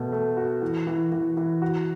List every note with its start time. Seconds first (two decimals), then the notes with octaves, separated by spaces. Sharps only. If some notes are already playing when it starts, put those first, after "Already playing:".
Already playing: B2 A3
0.12 A3
0.37 F#4
0.62 E3
0.87 E3
1.12 E3
1.37 E3
1.62 F#4